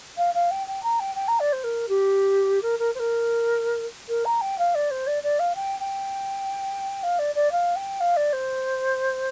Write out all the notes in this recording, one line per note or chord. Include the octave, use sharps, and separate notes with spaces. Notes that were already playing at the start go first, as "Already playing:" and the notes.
F5
F5
G5
G5
A#5
G5
G5
A#5
D5
C5
A#4
G4
A#4
A#4
C5
A#4
A#4
A#5
G5
F5
D5
C5
D5
D5
F5
G5
G5
F5
D5
D5
F5
G5
F5
D5
C5